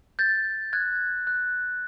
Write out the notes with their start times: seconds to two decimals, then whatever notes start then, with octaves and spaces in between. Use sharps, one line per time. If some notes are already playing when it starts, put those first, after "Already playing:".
0.19 G6 A6
0.73 F#6 G#6
1.27 F#6